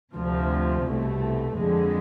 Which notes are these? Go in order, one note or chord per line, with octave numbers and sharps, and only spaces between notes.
D2 C3 F3
C2 B2 A3
F2 D3 G#3